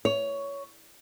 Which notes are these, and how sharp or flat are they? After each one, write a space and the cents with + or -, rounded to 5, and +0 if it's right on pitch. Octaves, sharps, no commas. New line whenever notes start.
C#5 +15